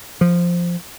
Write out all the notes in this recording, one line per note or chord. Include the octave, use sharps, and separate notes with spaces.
F3